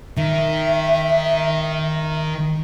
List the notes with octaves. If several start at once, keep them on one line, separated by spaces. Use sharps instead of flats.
D#3 E5